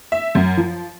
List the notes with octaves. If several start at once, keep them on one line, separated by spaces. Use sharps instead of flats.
E5
F#2
F3